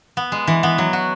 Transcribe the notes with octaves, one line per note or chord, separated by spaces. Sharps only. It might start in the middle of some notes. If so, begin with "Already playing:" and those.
B3
G#3
E3
B3
F#3
F#4